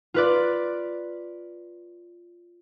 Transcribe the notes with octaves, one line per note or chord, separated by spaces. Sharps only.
F4 B4 D5